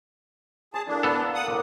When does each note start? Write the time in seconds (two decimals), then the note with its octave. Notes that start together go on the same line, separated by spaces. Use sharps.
0.74 G#4 A5 D#6
0.87 A3 A#3 D4 E4
1.03 B3 A4
1.22 A#4 E5 F5
1.34 F#5 D#6
1.47 A2 A#3 D6